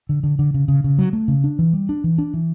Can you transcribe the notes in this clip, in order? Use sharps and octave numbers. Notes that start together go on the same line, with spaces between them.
D3
D3
D3
C#3
C#3
C#3
F#3
A3
C#3
D4
E3
G3
D4
E3
D4
E3